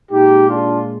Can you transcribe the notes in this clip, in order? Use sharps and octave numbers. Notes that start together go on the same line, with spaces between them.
A#2 G#3 D#4 G4
D4 F4